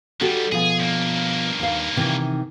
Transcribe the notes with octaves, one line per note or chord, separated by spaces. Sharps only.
D#3 G3 F#4 G4 A4
B2 F3 G#4 G#5
G2 A#3
D#2 F5
C3 D#3 E3